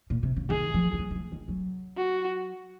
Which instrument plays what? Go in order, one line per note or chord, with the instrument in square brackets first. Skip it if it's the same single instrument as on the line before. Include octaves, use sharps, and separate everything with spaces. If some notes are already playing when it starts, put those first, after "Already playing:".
[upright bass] A#2
C3
C#3
[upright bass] D#3 [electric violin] G#4
[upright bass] F3
F3
F#3
D#3
F3
D#3
F#3
[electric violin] F#4